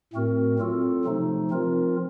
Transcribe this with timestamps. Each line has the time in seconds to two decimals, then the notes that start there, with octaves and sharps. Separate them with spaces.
0.13 A2 A3 C4 F#4 A#4
0.59 F#3 C4 F4 A4
1.05 C3 F3 A3 D#4
1.50 F3 C4 F4 A#4